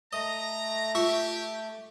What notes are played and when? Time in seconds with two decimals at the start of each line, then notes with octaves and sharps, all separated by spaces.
0.13 A3 D#5 A#5
0.95 F4 G4 E5 C#6